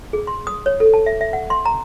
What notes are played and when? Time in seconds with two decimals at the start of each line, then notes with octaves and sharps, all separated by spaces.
0.13 G#4
0.27 C6
0.47 D#6
0.66 C#5
0.80 A4
0.94 A5
1.06 E5
1.21 E5
1.33 F#5
1.50 C6
1.65 A#5